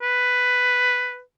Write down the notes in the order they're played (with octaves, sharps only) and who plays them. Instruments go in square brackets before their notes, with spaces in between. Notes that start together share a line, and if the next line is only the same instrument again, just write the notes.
[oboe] B4